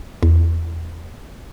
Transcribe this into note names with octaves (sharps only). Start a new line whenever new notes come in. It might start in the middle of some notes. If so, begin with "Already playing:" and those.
E2